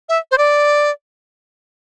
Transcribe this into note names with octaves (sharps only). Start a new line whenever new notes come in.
E5
C5
D5